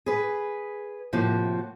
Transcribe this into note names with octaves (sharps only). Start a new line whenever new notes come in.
G#4 B4
A2 C3 F3 A#3 F#4